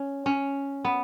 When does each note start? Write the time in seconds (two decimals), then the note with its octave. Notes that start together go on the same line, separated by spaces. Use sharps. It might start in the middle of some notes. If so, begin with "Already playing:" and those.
Already playing: C#4
0.26 C#4
0.85 B3